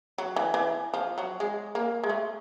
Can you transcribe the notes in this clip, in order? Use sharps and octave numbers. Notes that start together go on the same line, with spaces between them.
F#3
E3
E3
F3
F#3
G#3
A#3
G#3
A3